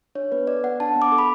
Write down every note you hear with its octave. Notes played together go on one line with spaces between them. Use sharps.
D4 C#5
B3 B4
A4 D5
B3 F#5
D4 A5
B3
D6
A4
B5